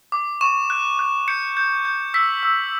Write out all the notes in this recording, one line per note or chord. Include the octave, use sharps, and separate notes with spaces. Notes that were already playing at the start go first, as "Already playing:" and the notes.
D6
C#6 E7
F#6
F#6
G6 C#7
G6
G6
E6 B6
E6